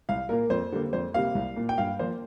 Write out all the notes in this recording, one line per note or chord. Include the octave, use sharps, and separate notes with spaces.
C2 F5
A#2 A#3 A#4
F2 C5
D3 G3 A#3
F2 C5
C3 G3 A#3 F5
C2
A#2 A#3
G5
G2 F5
F3 A#3 C5